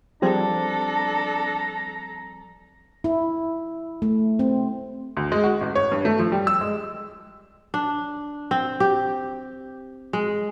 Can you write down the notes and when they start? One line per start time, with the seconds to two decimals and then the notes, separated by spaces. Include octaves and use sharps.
0.22 F3 G3 C4 D4 A4 A#5
3.04 E4
4.02 A3
4.39 C4
5.17 D2
5.32 G#3
5.44 F#4
5.61 A1
5.75 C#5
5.92 G2
6.05 A3
6.19 F3
6.32 G3
6.47 E6
6.61 G#3
7.74 D4
8.51 C4
8.80 G4
10.13 G#3